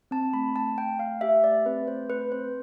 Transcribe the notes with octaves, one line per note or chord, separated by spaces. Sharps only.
C4 A5
A3 B5
A3 A5
A3 G5
A3 F5
G4 E5
A3 D5
C4 B4
A3 C5
A3 B4
C4 C5